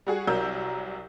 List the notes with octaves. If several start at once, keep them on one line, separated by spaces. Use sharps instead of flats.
G3 F#4 G#4
C2 F#3 A#4 E6 G6